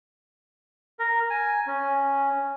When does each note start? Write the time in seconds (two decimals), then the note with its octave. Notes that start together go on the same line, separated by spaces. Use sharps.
0.99 A#4
1.30 G#5
1.67 C#4